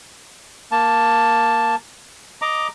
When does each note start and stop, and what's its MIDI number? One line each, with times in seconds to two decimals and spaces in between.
0.72 1.75 58
0.72 1.75 81
2.42 2.68 75
2.42 2.68 82
2.42 2.68 86